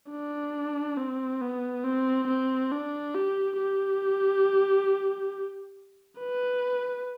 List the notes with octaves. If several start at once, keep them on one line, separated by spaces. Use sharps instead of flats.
D4
C4
B3
C4
C4
D4
G4
G4
B4